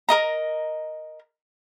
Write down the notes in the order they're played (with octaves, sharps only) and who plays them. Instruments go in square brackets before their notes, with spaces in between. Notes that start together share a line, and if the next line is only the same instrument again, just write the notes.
[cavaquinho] A#4 D#5 A#5